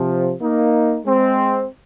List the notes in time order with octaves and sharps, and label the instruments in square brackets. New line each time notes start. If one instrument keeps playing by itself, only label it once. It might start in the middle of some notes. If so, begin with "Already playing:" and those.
Already playing: [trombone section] C3 F3
A#3 D#4
G#3 C4